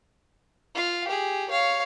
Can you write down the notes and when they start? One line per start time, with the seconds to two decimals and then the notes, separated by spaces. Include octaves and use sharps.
0.74 F4 F5
1.08 G4 G#4
1.49 C#5 F5